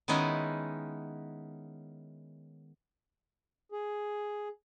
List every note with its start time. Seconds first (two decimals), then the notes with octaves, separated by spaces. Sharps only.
0.08 D#3 G#3 B3 C#4 D#4 E4
3.72 G#4